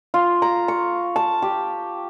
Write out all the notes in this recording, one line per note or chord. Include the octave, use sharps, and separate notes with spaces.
F4
A#5
C#6
A5
G4